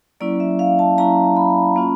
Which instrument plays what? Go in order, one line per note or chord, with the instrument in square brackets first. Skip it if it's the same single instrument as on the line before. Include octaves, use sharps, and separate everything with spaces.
[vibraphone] F#3 A#3 C#4 E4 D5
E5
F5
A5
F#3 A#3 C#4 E4 A#5
B5
A#3 C#4 F4